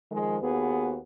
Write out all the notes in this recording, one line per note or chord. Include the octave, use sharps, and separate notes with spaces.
D#3 F3 G#3
D#2 B3 F#4 G#4 B4